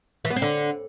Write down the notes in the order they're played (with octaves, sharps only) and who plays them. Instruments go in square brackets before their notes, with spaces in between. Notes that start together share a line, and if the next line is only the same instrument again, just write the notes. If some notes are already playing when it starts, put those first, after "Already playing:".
[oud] E3
B3
C4
D3